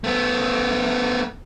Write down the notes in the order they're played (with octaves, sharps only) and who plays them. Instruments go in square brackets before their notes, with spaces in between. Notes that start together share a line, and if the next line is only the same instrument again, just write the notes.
[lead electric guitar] A3 B3